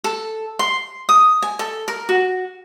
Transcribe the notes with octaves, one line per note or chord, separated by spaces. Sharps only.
A4
C6
D#6
G#5
A4
A#4
F#4